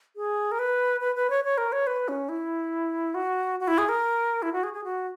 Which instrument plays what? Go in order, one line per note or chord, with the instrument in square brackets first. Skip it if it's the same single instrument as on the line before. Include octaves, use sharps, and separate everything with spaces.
[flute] G#4
A#4
B4
B4
B4
C#5
C#5
A#4
C#5
B4
C#4
E4
F#4
F#4
E4
G#4
A#4
E4
F#4
G#4
G#4
F#4